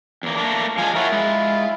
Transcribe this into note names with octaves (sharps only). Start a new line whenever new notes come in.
E2 A#3
A3 A#3 D4
F3 G#3 F5 G#5
E4 F4 A#4 C#5 F#5
G#3